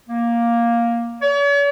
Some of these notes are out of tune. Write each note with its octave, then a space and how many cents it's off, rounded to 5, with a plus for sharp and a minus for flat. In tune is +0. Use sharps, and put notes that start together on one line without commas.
A#3 +5
C#5 +45